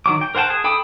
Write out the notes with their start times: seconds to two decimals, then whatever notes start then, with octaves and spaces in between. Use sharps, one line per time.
0.06 D#3 F#3 D6
0.21 G5
0.35 A#4 C5 F#5 G5 A5
0.50 G#4
0.64 A4 G5 B5 D6 D#6